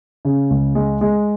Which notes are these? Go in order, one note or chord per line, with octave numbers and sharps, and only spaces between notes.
C#3
C#2
G#3
G#3